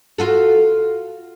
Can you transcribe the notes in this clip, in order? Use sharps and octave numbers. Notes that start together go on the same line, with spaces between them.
F4 F#4 A4